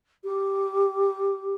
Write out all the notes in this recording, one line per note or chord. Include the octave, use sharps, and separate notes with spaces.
G4